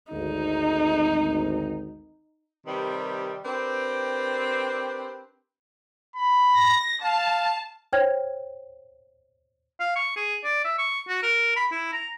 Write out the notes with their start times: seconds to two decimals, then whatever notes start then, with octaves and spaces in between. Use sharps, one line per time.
0.12 G#1 D2 D#4
2.67 C3 D#3 G3 A#4 B4
3.45 C4 D4 G4 A#4 B4
6.15 B5
6.56 A#6
7.03 F5 A5
7.93 C5 C#5 G5 F6 G#6
9.80 F5
9.96 C#6
10.16 G#4
10.44 D5
10.65 E5
10.78 C#6
11.08 F#4
11.23 A#4
11.56 B5
11.72 E4
11.93 A#5